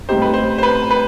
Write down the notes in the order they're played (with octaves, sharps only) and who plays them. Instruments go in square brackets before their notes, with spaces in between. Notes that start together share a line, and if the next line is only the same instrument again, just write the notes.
[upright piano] A2 G3 C4 D#4 G4 [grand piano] C5
[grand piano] B4
C5
C5
B4
B4